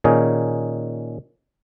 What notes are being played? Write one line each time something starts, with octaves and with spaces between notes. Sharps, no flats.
A#2 D#3 C#4 D#4 G#4